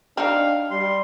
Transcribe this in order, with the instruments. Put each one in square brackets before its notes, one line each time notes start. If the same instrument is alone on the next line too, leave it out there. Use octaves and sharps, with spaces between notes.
[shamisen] C4 D#4 [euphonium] D4 [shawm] F5
[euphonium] G3 [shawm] C6